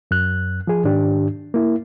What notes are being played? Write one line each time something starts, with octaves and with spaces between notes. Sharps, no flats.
F#2 F#6
F3 G#4
G#2 D#3 D4 G4
A#3 E4